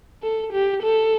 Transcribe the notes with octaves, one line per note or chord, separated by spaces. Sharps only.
A4
G4
A4